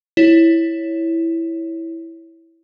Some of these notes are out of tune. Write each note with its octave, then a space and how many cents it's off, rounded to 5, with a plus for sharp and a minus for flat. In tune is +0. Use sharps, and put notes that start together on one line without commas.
E4 +0 C#5 +0